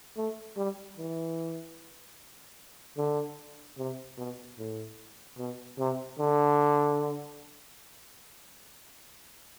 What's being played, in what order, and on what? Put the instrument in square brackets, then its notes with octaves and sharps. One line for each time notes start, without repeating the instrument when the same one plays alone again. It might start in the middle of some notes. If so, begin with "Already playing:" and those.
[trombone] A3
G3
E3
D3
C3
B2
A2
B2
C3
D3